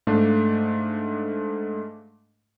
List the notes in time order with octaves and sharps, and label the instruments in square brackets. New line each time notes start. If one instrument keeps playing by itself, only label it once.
[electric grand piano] G#2 A3 D4 F5